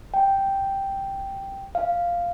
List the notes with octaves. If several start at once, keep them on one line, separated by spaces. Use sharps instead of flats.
G5
F5